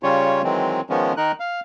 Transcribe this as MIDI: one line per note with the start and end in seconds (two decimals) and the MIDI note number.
0.03 0.42 49
0.03 0.42 55
0.03 0.42 61
0.03 0.42 65
0.03 0.42 73
0.44 0.81 51
0.44 0.81 52
0.44 0.81 54
0.44 0.81 56
0.44 0.81 60
0.90 1.13 51
0.90 1.13 53
0.90 1.13 56
0.90 1.13 59
0.90 1.13 61
1.17 1.32 51
1.17 1.32 63
1.17 1.32 70
1.17 1.32 90
1.40 1.60 77